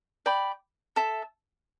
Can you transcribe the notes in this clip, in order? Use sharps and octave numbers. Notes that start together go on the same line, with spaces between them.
D5 G5 B5
A4 E5 A5